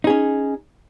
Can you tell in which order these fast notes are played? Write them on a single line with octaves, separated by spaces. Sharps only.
D#4 G#4 C#4